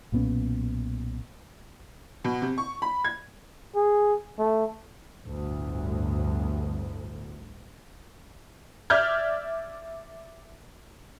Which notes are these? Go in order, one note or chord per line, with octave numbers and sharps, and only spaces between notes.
B1 A#2 B3 C#4
B2
C3
C#6
B5
G#6
G#4
A3
G1 D2 A2
D5 E5 F6 G6 G#6